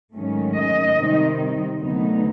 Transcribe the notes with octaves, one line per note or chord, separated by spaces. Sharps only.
G#2 D#3 F#3 A3 C#4
D#5
C3 D#3 G3 C4 D#4
D2 D3 F#3 B3 D#4